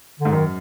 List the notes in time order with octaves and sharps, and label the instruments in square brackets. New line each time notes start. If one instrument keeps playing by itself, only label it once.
[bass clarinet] D3
[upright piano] G#2
[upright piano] F#2 [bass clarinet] D#3